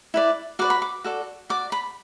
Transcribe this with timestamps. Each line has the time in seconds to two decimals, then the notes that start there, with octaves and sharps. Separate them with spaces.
0.14 E4 B4 D5
0.59 F#4 B4 D5 D6
0.70 B5
0.82 D6
1.04 F#4 A4 D5
1.49 F#4 D5 D6
1.72 B5